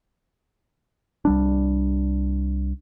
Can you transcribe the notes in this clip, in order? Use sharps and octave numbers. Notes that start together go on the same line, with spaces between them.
C2 G3 D4